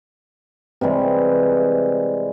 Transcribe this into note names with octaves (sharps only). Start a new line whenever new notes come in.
C3 E3 G3 G#3